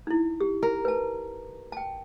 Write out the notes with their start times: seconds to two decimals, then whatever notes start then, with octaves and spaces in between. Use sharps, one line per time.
0.07 D#4 E4
0.41 G4
0.63 A#4
0.85 B4 A5
1.72 G5 A5